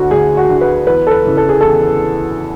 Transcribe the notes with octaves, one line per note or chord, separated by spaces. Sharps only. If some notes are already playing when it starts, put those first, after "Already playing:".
Already playing: D2 D3 F#4
D2 G#4
F#4
D3
B4
E2 B4
A4
B4
C#3 E3
A4
G#4
E2 A4